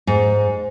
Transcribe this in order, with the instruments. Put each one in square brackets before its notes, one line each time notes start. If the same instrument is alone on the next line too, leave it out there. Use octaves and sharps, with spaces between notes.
[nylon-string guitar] G#2